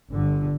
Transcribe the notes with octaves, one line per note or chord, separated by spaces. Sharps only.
G1 G2 D3